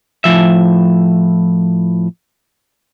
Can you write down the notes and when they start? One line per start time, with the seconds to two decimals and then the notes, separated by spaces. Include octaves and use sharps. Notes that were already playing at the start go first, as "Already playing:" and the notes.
0.24 A2 F3 E5